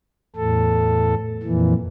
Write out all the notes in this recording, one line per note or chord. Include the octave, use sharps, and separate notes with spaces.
E2 A2 A4
F2 A#2 E3